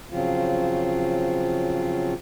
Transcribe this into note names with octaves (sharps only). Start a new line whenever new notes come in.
C#3 F3 F#3 C4 F4